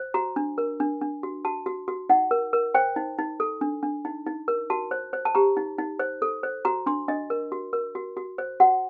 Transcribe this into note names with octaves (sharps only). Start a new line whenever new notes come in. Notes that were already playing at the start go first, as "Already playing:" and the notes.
Already playing: C5
F#4 A#5
D4
A#4
D4
D4
F#4
F#4 A5
F#4
F#4
D#4 F#5
A#4
A#4
C5 G5
D#4
D#4
A4
D4
D4
D#4
D#4
A#4
F#4 A5
C5
C5
A5
G4 A#5
D#4
D#4
C5
A4
C5
F#4 A#5
D4 C6
D4 D#5
A#4
F#4
A#4
F#4
F#4
C5
F#4 F#5